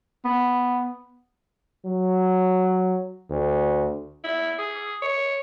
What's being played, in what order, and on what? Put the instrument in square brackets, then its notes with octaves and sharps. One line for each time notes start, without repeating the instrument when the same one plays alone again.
[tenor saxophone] B3
[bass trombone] F#3
D2
[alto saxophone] E4
G#4
C#5